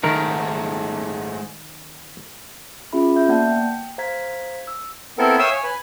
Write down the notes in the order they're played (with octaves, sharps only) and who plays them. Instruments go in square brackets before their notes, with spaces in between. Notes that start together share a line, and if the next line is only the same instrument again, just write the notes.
[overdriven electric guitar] G#2 A3 [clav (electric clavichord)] D#3 A#4
[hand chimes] C#4 F4 G#4 E5 B5
E5 G6
A#3 B3 D5 F#5 A5 G6
G5
C5 F5 A#5 G#6 B6
E6
[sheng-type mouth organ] B3 C4 E4 A4 A#4
C#5 E5 F5 G5 D#6 E6
C#5 G#5
B4 G#5